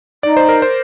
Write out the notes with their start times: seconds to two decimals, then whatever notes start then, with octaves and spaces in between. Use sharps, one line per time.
0.23 D#4 D5
0.37 C5
0.49 A#4
0.62 C5